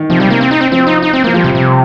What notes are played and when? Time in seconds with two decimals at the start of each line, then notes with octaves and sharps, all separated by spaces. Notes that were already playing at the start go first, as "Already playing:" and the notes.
Already playing: D#3
0.10 C3 F3
0.20 G3
0.30 A#3
0.41 C4
0.51 D#4
0.61 C4
0.72 F3 C4
0.87 D#4
1.02 D#4
1.13 C4
1.24 F3 A#3
1.34 F3 G3
1.44 C3
1.55 C3